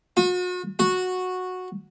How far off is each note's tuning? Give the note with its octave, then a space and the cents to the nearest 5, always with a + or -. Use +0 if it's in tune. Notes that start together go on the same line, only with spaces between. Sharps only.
F#4 -40
F#4 -10